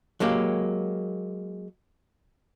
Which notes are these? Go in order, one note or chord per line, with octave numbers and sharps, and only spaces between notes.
F#3 G#3 A#3 G4